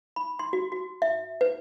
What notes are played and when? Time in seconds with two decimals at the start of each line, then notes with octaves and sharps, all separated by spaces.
0.16 B5
0.39 C6
0.53 F#4
0.72 F#4
1.02 E5
1.41 B4